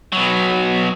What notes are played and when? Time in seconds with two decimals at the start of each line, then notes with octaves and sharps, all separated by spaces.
0.12 B2 F#3